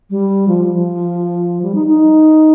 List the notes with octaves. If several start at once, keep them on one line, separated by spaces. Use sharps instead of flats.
G3
F3
F3
G3
D#4
D#4